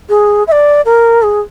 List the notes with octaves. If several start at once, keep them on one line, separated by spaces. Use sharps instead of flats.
G#4
E5
D5
A#4
G#4